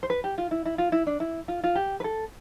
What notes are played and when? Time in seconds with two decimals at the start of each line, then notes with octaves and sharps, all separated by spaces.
0.03 C5
0.10 B4
0.24 G4
0.38 F4
0.51 E4
0.65 E4
0.78 F4
0.92 E4
1.07 D4
1.20 E4
1.48 F4
1.64 F4
1.75 G4
2.00 B4
2.04 A4